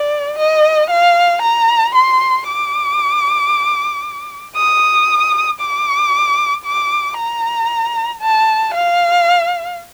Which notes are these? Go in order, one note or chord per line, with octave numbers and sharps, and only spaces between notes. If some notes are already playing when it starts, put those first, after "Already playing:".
Already playing: D5
D#5
F5
A#5
C6
D6
D#6
D6
D6
A#5
A5
F5